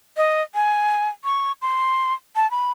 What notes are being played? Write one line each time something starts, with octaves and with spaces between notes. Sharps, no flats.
D#5
G#5
C#6
C6
A5
B5